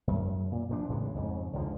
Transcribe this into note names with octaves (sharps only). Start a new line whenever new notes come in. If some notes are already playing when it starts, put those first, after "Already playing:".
F#2
A#2
A#2 F3 D4
A2 C#3 E3 G#3
F2 G#2 C#3
C#2 G#2 D3 F3